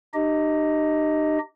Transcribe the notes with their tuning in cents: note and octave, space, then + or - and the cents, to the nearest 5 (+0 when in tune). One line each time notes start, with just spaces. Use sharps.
D#4 -40 G4 -15 D#5 +15